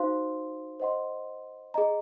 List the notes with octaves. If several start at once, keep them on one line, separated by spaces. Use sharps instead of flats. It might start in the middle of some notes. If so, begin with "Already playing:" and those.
Already playing: D#4 F#4 C5 F5 C6
C5 D#5 F#5 C6
G#4 D#5 A#5